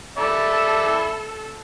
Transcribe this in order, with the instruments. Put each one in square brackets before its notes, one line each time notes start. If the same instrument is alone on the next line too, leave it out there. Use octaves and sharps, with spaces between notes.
[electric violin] A4 [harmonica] D5 E5 B5